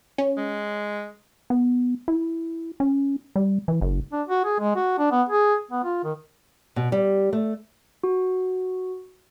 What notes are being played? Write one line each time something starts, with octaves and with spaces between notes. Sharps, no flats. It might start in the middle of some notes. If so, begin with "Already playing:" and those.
C#4
G#3
B3
E4
C#4
G3
E3
F#1
D4
F#4
G#4
G#3
F#4
D4
B3
G#4
B3
F4
D#3
B2
G3
A3
F#4